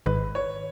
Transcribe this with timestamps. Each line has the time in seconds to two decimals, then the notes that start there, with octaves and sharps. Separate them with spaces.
0.06 G#1 G#2 D#3 B4
0.35 C#5